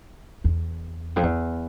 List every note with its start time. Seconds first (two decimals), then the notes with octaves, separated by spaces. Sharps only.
0.44 E2
1.16 F2
1.23 E2